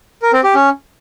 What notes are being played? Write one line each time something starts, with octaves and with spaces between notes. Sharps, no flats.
A#4
C4
G4
C#4